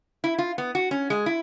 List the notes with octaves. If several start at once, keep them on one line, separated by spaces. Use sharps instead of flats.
E4
F4
B3
F#4
C#4
G#3
E4